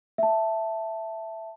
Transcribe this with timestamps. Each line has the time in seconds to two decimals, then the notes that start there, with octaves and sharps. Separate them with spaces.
0.18 E5 A5